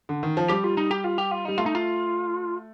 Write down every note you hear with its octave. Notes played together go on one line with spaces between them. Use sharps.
D3
D#3
F3
G3 G4
F4
D#4
G4
F4
G4
F4
G3 D#4
A3 F4
D#4
F4